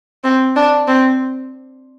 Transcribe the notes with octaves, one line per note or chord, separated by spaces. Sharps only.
C4
D4
C4